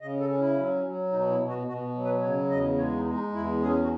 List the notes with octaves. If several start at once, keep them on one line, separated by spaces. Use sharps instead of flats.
C#3 D#5
A4
C#4
E4
F#3
F#3
B2 D#4
E4
B2
F#4
B2 F#4
F#3
B4
C#3 C#5
E2 D#5
G#3 C#5
D#4
G#3
D#4
E2 E4
C#4 G#4
F#4